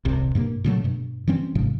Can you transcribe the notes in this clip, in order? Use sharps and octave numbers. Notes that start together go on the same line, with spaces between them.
D#1 C2 C3
G2 B2 A#3
A#2 C#3 F#3 A3
G2 B2
E3 G3 C4 C#4
G#1 G#2 C3 F3